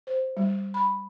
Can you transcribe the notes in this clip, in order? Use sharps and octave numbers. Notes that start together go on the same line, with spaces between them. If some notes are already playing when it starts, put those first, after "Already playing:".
C5
G3
B5